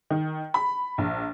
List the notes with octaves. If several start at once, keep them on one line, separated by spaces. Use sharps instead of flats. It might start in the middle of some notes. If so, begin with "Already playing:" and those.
D#3
B5
A#1